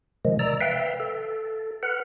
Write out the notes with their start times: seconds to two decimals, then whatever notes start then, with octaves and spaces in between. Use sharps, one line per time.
0.25 C3 D#3 F3 G#3
0.39 D5 A#5 E6
0.61 B4 E5 F5 G5
1.00 A4
1.83 B4 F#5 F6